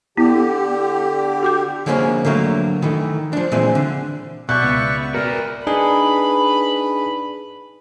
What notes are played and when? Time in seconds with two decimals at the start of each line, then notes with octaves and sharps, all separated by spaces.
0.17 D3 B3 E4 G4
1.43 F#4 D6 G6
1.86 D3 F3 G#3 A#3 C4 C#4
2.25 D3 F#3 A3 A#3
2.82 D#3 E3 A3
3.33 F3 D4
3.52 A#2 E3 G#3 C4
3.75 D3
4.49 B2 D5 E5 C#6 F#6 G6
4.63 C#2 B3
5.14 F#4 A#4 B4 D5
5.67 D4 D#4 G#4 B4 B5